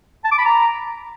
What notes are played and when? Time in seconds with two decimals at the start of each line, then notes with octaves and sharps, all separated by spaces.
0.25 A5
0.31 D6
0.38 B5
0.45 A#5